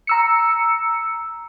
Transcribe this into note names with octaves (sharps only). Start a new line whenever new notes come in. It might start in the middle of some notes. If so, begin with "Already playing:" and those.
A#5 E6 C#7